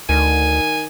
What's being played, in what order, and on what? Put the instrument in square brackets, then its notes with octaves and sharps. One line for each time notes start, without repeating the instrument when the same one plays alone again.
[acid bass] D2 [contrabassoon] D#3 [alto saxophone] G#5